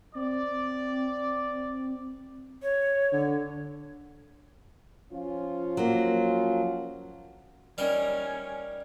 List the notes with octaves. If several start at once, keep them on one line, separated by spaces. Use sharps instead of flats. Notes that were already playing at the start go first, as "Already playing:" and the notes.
C4 D5
C#5
D3
F3 C#4 F4
F#3 A#3
G3 C#4 D#4 A#4